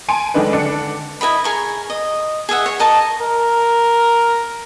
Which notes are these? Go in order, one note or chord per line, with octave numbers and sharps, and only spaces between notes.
G#5 A5 C6 D7
D#3 G#3 A3 D4 D#4 B4
D3 D4 C#7
E4 A#4 D#5 B5
G#4 A#4 C#6
D#5
G#4 D#5 E5 F#5
C#5
A#4 D#5 A5 A#5
A#4